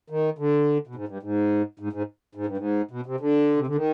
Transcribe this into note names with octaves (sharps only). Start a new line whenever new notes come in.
D#3
D3
B2
G#2
G2
G#2
G#2
G#2
G#2
G2
G#2
B2
C3
D3
C3
D3
D#3